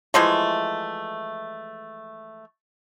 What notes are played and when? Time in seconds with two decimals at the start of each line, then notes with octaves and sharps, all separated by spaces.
0.14 E3 F3 G#3 A3